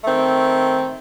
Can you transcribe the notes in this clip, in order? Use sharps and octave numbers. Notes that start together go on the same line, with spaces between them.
D#3 A3 C4